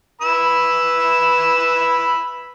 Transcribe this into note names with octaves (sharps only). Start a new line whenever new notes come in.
B4 B5 E6